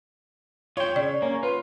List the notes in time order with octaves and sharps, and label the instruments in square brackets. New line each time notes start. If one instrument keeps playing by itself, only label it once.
[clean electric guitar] F4 G5 [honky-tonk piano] C#5
[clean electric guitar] C#3 [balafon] D5
[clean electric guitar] A#3 [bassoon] C#4
[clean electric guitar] F4 [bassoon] B4